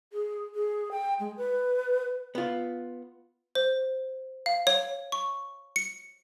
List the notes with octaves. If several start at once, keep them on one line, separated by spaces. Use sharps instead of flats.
G#4
G#4
G5
G#3
B4
B3 F4
C5
F5
C#5
C#6
C#7